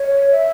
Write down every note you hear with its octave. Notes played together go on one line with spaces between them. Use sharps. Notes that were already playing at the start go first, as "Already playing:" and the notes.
Already playing: C#5
E5